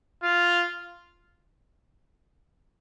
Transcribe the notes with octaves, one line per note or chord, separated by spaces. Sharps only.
F4